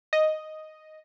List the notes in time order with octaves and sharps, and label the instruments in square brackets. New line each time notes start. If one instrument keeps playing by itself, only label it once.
[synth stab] D#5